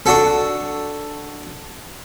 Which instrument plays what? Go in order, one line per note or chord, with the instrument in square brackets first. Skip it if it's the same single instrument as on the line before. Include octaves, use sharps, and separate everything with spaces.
[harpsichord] D4 F#4 A4